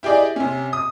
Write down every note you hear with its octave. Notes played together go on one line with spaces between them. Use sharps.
E4 G4 G#4 D5 D#5
C3 C#4
D#6